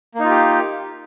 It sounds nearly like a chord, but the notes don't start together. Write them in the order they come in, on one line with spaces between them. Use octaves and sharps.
A#3 D#4 F4 G4